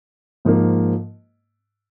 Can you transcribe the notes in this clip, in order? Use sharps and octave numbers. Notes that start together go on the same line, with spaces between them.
G#2 F3 A#3